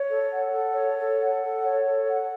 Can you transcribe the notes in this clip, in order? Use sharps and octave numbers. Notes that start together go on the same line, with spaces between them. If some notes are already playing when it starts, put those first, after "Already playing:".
Already playing: C#5
A4
F#5
A4
C#5
A4
F#5
A4
C#5
A4
F#5